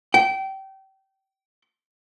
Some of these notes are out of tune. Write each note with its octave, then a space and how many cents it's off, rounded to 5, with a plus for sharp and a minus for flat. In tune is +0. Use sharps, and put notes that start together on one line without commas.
G5 -25